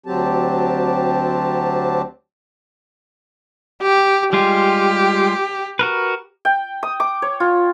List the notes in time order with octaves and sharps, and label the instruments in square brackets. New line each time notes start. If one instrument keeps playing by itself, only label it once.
[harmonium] D2 F#3 C4 G4 A5
[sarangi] G4
[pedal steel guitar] G3 G#3 F4 [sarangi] G4
[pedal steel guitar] F#4 A#4 B4
[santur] G5
D#6
D6
C#5
F4